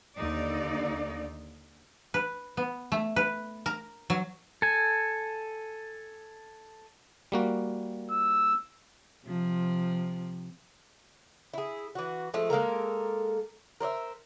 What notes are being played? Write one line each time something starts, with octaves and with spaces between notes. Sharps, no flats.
D#2 D3 D#4 D5
B4
B3
A3
B4
A#4
F#3
A4 G#5
G3 A#3 F#4
E6
C3 F3
E4 G#4
E3 F#4
F3 G#3 A3
G#3 A#3 A4 A#4
A#4 C5 D5 E5